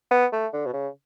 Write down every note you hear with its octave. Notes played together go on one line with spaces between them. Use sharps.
B3
A3
D3
B2
C#3